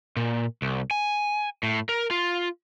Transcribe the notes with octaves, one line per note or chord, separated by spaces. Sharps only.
A#2
C2
G#5
A2
A#4
F4